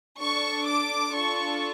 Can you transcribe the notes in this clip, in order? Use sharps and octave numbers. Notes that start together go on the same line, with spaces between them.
D4 A4 C#6
D6
D4 F4 A4 C#6